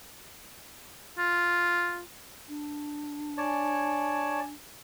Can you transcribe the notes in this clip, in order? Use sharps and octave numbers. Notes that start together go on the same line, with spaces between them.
F4
D4
C#5 D5 G#5 A5